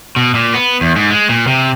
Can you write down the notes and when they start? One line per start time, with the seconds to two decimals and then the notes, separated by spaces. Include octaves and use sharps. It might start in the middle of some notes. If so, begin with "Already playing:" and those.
0.16 B2
0.35 A#2
0.54 B3
0.81 E2
0.96 G#2
1.11 G#3
1.29 A#2
1.47 C3